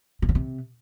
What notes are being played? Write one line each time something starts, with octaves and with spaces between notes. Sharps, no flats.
C3
C#3
C3